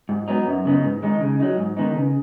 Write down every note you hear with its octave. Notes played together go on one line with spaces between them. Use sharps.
G#2
F#3 B3 D#4
F#2
C#3 B3 D#4
G#2
D#3 G#3 D#4
C#3
F#3 D#4
G#2
D#3 B3 D#4
C#3